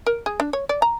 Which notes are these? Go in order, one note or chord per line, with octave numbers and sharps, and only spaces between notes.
A#4
G#4
D4
C#5
D5
A#5